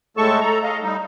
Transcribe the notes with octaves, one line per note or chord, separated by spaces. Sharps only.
A2 G#3 A3 A4 A5 C#6
A4 A#5
D#5 F5
G3 D#4